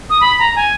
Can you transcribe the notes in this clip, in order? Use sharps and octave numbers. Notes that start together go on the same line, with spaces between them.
D#6
B5
A#5
G#5